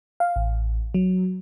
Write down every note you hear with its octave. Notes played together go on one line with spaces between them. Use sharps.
F5
A1
F#3